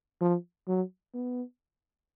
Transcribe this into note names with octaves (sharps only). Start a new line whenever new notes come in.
F3
F#3
B3